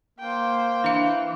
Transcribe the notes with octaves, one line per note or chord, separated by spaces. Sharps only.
A#3 C5 G5
E3 D4 F5